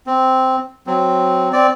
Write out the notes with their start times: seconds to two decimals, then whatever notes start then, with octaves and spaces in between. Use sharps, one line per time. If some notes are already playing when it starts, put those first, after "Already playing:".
0.07 C4
0.87 F#3 C4
1.53 C4 D5